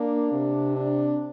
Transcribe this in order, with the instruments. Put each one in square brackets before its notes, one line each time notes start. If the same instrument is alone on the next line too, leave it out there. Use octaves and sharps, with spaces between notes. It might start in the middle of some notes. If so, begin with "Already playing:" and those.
Already playing: [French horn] A#3 [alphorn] D4
[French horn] C3
[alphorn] D4